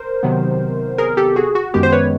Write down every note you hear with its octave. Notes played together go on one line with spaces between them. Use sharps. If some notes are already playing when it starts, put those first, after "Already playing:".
Already playing: A#4 C5
C3 D#3 F#3 B3
G#4 A#4
G4 A4
F#4 G#4
F#4
F#2 D#3 G#3 B3 G4
C5
B4 C#5